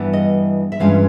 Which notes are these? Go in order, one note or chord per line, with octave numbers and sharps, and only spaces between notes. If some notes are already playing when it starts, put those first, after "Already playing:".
Already playing: G2 E3 G3 B3
D#5
E5
G2 E3 G#3 C#4 F4 F5